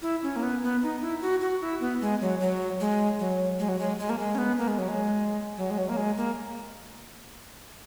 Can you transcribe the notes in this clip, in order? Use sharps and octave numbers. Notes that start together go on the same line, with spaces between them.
E4
C#4
A#3
B3
B3
D#4
E4
F#4
F#4
E4
B3
G#3
F#3
F#3
G#3
F#3
G#3
F#3
G#3
G#3
A#3
G#3
C#4
B3
A#3
G#3
F#3
G#3
F#3
G#3
F#3
A#3
G#3
A#3